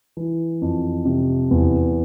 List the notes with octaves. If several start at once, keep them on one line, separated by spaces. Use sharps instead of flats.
E3
F2
C3
E2